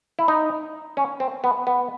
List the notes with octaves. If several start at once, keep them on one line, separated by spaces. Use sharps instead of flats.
E4
D#4
C#4
C4
B3
B3